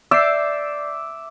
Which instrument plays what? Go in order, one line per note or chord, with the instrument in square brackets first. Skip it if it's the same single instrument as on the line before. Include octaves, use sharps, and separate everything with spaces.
[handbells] D5 G6 C7 [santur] E5 D6 E6